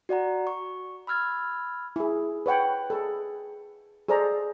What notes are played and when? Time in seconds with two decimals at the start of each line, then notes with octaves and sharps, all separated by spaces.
0.09 F#4 D5 F#5 A#5
0.47 C#6
1.07 B5 E6 F6 G#6 A6
1.96 E4 G#4
2.46 B4 C#5 F#5 G5
2.90 G#4 A4
4.08 G#4 A4 C5 D5 A#5